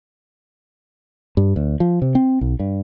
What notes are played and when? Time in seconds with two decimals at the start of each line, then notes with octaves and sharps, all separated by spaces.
1.37 G2
1.56 D2
1.80 F3
2.02 C3
2.15 C4
2.41 B1
2.60 G2